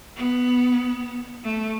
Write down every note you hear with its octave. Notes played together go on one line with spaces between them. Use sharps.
B3
A3